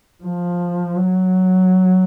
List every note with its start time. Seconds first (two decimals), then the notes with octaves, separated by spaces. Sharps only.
0.24 F3
0.96 F#3